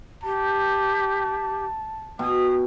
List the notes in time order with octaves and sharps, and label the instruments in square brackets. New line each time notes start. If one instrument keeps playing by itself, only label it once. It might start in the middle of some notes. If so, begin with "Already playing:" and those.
[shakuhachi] G4 [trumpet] A5
[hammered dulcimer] B2 G5 [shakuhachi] D#6